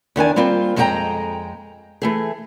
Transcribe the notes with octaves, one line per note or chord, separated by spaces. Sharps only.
E2 D#3 D4 G#5
G3 A#3 C4 F4
F2 G#3 D#4 G4 G5 A#5
E3 A3 G#4